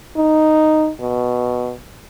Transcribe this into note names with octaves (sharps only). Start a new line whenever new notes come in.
D#4
B2